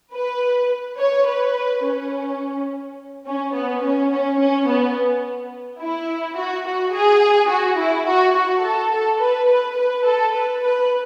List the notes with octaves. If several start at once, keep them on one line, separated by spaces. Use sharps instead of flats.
B4
C#5
B4
C#4
C#4
B3
C#4
C#4
C#4
B3
E4
F#4
F#4
G#4
F#4
E4
F#4
F#4
A4
A4
B4
B4
B4
A4
B4
B4